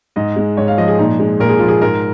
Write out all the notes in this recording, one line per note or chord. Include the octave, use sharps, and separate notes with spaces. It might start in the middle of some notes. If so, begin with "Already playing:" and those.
G#2 D#5
G#3
G#2 C#5
F5
F3 D#5
G#4
A#2 D#4
G#3
A#2 A#4
G#4
F3 F4
G#4
G#2 A#4